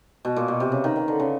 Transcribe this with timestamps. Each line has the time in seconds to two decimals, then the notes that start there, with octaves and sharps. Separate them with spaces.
0.25 B2
0.36 A#2
0.48 B2
0.60 C3
0.72 C#3
0.84 D#3
0.96 D#3
1.08 D3
1.20 C#3